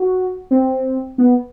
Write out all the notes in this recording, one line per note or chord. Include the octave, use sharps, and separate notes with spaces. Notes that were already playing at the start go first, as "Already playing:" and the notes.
Already playing: F#4
C4
B3